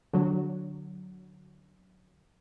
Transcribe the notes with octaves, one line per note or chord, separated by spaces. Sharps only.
D3 F#3